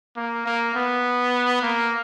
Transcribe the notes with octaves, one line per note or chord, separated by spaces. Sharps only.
A#3
A#3
B3
A#3